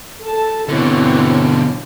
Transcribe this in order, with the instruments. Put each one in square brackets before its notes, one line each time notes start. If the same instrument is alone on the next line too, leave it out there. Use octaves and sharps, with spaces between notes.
[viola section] A4 A5
[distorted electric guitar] B2 D3 [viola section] E3 C4 C#5